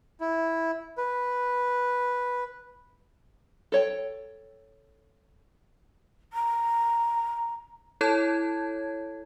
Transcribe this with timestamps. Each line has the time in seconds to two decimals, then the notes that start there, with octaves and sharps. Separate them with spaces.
0.21 E4
0.98 B4
3.72 A4 C#5 G5
6.33 A#5
8.01 E4 A4 C#5 A5 G#6